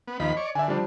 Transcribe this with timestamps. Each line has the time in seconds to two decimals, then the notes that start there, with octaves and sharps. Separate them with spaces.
0.07 B3
0.20 D#2 F3 D#5 B5
0.37 C#5 D5
0.55 D3 E5 G#5
0.68 F3 G3 D4